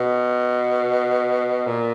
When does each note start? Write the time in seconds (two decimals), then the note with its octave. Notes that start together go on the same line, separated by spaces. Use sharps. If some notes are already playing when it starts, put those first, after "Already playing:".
Already playing: B2
1.67 A#2